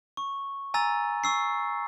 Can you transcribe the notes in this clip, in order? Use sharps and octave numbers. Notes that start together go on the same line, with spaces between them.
C#6
G#5 A#5 E6 A6
C#6 E6 C7